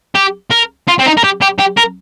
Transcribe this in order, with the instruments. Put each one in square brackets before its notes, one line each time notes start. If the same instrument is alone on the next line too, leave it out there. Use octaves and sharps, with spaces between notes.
[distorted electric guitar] G4
A#4
F4
C4
D#4
A#4
G4
G4
G4
A#4